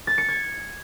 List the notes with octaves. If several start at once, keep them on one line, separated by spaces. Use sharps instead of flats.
A6
C#7
G#6